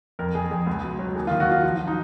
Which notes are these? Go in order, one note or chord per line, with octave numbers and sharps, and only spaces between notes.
F2 A#4
F2 G#4
F2 G#4
C#2
B2
F#3
D#2 G#4
F4
D#3
F#4
F#3 F4
F3 F4
D#4